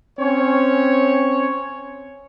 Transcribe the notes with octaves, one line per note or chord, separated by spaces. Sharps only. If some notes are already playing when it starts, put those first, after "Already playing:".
C4 C#4 C#5